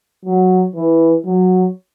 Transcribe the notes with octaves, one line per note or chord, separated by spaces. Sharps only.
F#3
E3
F#3